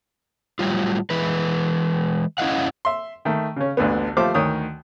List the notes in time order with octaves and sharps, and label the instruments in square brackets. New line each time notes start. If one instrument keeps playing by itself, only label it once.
[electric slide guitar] A2 F#3 G3 F4
E3 G#3 B4
C#4 E4 F#4 D#5 F5 F#5
[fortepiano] E5 C6
D#3 A3
C#3 C#4
A1 D2 D3 B3
F3 A3 G4 C5 F5 D6
D2 D#3 C#5 D#6